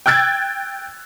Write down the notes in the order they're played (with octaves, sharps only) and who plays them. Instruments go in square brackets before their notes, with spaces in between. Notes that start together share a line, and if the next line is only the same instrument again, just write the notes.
[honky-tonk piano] G5 E6 F#6 G#6 A6